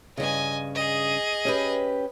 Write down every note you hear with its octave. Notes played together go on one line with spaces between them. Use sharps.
G2 C#3 D#5 G#5
G#4 D#5
C#4 G4 B4